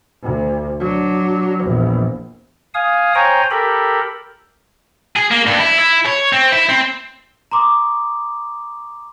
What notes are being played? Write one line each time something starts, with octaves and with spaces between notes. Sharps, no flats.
D2
F#3 D4
A#1 E2
F5 G#5 D#6
C5 C#5 G5 G#5 A#5
G4 A4 A#4 B5
G#4
A#3
G2
E4
E4
C#5
C4
E4
C4
A#5 C6 D6 D#6